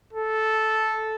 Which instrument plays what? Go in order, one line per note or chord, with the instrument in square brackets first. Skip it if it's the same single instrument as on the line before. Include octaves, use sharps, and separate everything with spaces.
[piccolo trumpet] A4